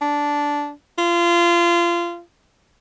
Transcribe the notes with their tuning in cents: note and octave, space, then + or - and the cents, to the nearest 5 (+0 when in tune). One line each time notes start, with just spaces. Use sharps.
D4 -10
F4 -25